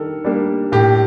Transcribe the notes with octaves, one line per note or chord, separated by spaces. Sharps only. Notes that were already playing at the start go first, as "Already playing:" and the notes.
Already playing: D#3 G3 D4 A4 A#4
G3 A#3 D4
A2 G4